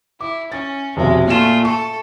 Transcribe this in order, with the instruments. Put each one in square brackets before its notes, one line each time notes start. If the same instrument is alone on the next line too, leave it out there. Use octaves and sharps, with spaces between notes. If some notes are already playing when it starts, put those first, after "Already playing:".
[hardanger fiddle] E4 [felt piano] D6
[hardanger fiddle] C#4 [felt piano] A6
[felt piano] F1 B1 E5 [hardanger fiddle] G#3
[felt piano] A#2 E7 [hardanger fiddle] A3 F4
[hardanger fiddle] A4 [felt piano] C#6